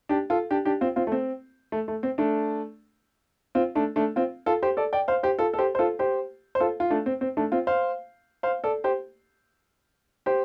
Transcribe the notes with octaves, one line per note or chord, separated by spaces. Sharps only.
D4 G4
F4 A4
D4 G4
D4 G4
C4 F4
C4 F4
A3
C4
A3
A3
C4
A3 D4
C4 F4
A3 D4
A3 D4
C4 F4
F4 A4
G4 C5
A4 D5
D5 G5
C5 F5
G4 C5
F4 A4
A4
G4 C5
C5
F4 A4
G4 C5
C5
F4 A4
F4
A3 D4
C4
C4
A3 D4
C4 F4
C5 F5
C5 F5
A4 D5
G4 C5
G4 C5